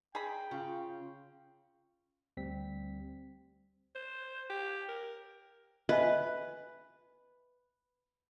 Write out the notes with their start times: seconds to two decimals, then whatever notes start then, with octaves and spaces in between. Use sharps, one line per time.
0.15 G#4 G5 A#5 B5
0.51 C#3 F4
2.37 D2 G3 C4 B6
3.95 C5
4.50 G4
4.88 A#4
5.89 B4 D#5 E5 G#5